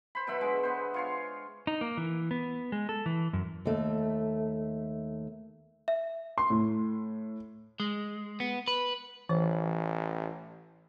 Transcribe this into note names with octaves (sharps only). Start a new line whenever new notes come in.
C5 B5
B2 F#3 E5 B5
D3 G#3
B3 C5
F4 C#5 C6
D#4
A#3
E3
B3
G#3
A4
E3
F#2
D#2 A3
E5
C6
A2
G#3
B3
B4
A1 E3 C#5